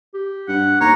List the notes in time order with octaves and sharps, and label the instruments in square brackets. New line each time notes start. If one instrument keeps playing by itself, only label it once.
[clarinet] G4
[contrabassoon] G2 [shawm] F#5
[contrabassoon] D#2 [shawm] C#5 [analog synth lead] A#5